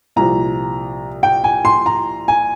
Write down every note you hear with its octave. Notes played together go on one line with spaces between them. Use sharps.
C2 A#2 F3 A#5
G5
G#5
C6
A#5
G#5